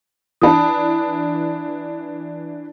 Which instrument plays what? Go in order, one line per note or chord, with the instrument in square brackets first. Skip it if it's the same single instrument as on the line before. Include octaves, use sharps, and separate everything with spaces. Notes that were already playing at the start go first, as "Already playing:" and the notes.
[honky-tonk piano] E3 D4 [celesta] A5 B5 D#6